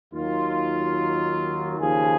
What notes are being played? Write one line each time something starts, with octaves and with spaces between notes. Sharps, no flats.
D#2 D#3 F#3 F4
D#2 C#3 F3 G#4